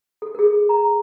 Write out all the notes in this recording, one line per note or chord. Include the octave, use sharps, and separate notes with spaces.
A4
G#4 A#4
A#5